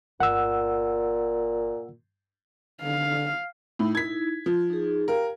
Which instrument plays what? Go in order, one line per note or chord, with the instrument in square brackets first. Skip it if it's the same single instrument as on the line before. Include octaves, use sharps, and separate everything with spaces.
[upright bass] G1 [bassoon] A#2 [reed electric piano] F#5 E6
[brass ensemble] D3 [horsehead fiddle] F5
[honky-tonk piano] A2 [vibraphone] D#4 E4
[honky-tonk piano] G#6 B6
[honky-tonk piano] F3 [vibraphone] F4
[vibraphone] D#4 G#4
[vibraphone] G4 F5 G5 [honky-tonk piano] A#4